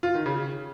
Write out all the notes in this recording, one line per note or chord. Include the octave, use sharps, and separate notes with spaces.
F4
D#3
C#3